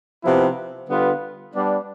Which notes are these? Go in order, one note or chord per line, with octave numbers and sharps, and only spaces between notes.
C3 F3 B3 E4 B4
D3 G3 B3 F4 B4
G3 B3 D4